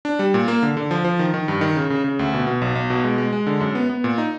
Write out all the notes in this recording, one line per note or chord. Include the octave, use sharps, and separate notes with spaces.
D4
G3
A#2
A#3
D3
D3
F3
F3
D#3
D#3
G2
D#3
C#3
C#3
C#3
D2
B2
B2
B1
B1
B2
G#3
G#3
G#3
D3
F#2
B3
B3
A#2
D#4